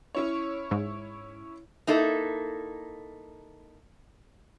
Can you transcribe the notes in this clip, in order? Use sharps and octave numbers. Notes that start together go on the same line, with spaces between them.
C#4 E4 C#5
G#2
A#3 D#4 E4 A4